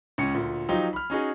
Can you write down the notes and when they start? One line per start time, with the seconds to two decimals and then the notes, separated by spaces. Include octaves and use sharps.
0.18 C#2 C#4 C#7
0.34 D2 A#2
0.69 F3 F#3 D#4 F4 G4 C5
0.93 B5 F6
1.10 C#4 D#4 F#4 G#4